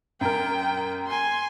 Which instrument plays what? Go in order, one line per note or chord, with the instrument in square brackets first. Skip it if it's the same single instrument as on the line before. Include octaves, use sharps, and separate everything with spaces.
[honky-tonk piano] F#2 A#4 [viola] G5
[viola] G#5 C6